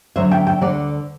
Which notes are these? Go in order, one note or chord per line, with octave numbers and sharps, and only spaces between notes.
D2 D3 F#3 C5 E5
E5 G5
E5 G5
D2 D3 F#3 D5 F#5